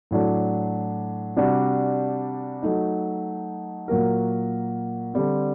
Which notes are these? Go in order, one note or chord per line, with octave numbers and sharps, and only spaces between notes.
A2 F#3 A3 D4
C3 G3 D4 F#4
F#3 A3 D#4
A#2 F#3 A#3 F#4 A#4
D3 G3 C4